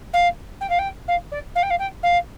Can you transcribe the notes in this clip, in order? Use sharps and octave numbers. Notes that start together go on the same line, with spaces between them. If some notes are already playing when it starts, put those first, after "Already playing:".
F5
G5
F5
G5
F5
D5
F5
G5
F5
G5
F5